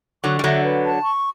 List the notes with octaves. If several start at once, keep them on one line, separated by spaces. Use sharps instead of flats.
D3 F#3 C#6
G3
D3 F#3 E5
B4
A5
C#6